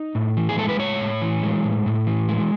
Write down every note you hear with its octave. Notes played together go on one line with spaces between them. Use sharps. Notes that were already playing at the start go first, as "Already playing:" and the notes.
Already playing: D#4
A2
E3
G#4
G#3 A4
B4
A2 C#5
A2
E3
G#3
A2
A2
E3
G#3